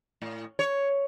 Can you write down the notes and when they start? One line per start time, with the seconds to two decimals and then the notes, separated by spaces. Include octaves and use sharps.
0.22 A2
0.59 C#5